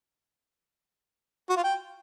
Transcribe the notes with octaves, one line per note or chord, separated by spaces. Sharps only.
F#4
F4
G5